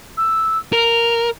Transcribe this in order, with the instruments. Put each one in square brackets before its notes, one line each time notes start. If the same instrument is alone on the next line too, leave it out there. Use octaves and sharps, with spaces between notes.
[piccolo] E6
[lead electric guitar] A#4 [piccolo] F7